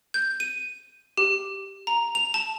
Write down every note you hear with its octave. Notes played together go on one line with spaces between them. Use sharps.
G6
D#7
G4
A#5
F7
A5